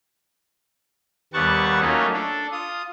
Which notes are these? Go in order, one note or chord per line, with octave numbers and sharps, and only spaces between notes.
D#2 G3 B3 F#5 A5 C#6
F#3 A3 A#3 C#4 D#4 F4
D4 A4
F4 D#6